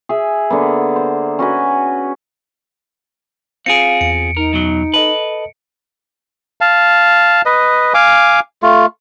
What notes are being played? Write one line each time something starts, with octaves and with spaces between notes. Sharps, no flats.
G#4 E5
D3 A#3 B3
C5
C#4 F#4 B4 G#5
C4 F4 G#4 F5 C#7 D7
E2 C#7
D#4 A#4
F#2 B2 F#3
A4 B4 D#5 A5
F5 A5
B4 D#5
F5 G#5 D6
A3 F4